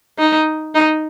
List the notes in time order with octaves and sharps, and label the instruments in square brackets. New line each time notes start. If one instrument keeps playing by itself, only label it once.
[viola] D#4
D#4